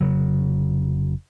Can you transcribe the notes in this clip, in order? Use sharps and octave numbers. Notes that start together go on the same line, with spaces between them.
F1 C#3 F#3